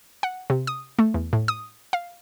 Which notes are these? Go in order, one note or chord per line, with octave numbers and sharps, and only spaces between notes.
F#5
C3
D#6
A3
E2
A2
D#6
F5